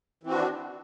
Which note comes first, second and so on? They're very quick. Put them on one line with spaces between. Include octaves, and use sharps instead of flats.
E3 C4 F#4 D4 D#3